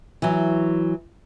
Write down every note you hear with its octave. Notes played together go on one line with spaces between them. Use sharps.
E3 F#3